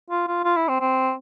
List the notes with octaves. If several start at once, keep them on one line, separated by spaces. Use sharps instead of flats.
F4
F4
F4
E4
C4
C4